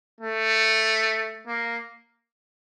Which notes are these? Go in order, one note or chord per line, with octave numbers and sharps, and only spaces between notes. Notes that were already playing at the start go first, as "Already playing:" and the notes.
A3
A#3